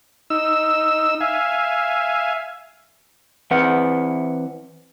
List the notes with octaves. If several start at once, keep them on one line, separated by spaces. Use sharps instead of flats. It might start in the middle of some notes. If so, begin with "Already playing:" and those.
D#4 E6
E5 F5 G#5
E3 C4 B4 F#5